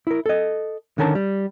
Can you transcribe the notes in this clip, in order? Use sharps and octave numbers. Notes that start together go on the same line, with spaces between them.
E4 A#4
A4 D#5
D3 D#3 C#4 A#4 A5
G3